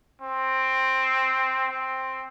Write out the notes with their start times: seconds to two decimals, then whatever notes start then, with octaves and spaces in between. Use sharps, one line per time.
0.22 C4
1.70 C4